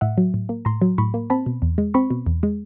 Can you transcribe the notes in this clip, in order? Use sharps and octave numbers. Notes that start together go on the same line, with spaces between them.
A2 E5 F#5
F#3
A2
A#3
A2 A#5 C6
F#3
A2 B5 C#6
A#3
C4 A5 B5
B2
E2
G#3
C4 B5 C#6
B2
E2
G#3